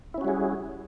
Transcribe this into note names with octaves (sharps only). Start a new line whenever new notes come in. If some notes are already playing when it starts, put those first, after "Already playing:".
G3 C#4 E4 F#4 G#4